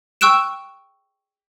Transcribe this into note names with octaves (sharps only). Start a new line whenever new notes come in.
G5 C#6 E6 F#6 D7 E7